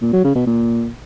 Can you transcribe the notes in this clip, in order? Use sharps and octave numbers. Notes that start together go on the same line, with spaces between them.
A#2
F#3
C#3
B2
A#2